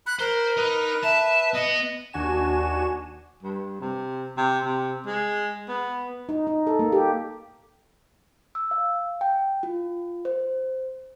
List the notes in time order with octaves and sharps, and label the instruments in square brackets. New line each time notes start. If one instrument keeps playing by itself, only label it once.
[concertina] B5 [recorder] F#6
[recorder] A#4 [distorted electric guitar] C5
[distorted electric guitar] D#4 [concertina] B4
[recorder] E5 [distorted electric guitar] A5
[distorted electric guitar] B3 [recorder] D#5
[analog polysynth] D#2 D4 F#4 G#5 E7
[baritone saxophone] G2
C3
C3
C3
G#3
B3
[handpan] D#4
D#4
A4
A#3
G4
[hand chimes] E6
F5
G5
F4
C5